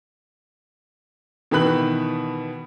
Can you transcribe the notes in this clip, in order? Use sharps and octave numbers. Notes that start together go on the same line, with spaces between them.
B2 D#3 E3 B5 F#6 F#7